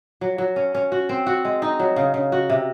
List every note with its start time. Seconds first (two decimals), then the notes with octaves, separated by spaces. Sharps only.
0.21 F#3
0.38 F#3
0.56 C#4
0.75 C#4
0.92 F#4
1.09 C4
1.26 F#4
1.45 G#3
1.62 D#4
1.79 F#3
1.96 C#3
2.14 C#3
2.32 F#4
2.50 C3